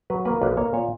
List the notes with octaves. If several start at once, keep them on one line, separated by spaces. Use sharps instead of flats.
F#3 B4
A#3 B4
B1 B4
A#3 C#5
A#2 C#5